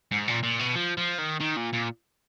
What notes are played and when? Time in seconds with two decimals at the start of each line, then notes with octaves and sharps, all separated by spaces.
0.12 G#2
0.28 A#2
0.43 A#2
0.60 B2
0.75 F3
0.97 F3
1.18 D#3
1.41 D#3
1.57 A#2
1.73 A#2